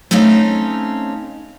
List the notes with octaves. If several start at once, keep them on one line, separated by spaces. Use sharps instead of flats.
A3 C4 C#4 D#4 F5